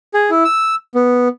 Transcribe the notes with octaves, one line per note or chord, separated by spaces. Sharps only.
G#4
E4
E6
B3